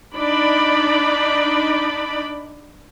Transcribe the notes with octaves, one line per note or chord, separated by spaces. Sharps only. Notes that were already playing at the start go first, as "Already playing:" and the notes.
D4 D#4 D5 B5